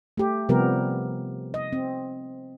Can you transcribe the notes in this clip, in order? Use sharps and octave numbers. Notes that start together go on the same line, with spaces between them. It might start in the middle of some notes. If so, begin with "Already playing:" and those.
A3 G4
C3 F3 G3 B3 G4 A#4
D#5
C4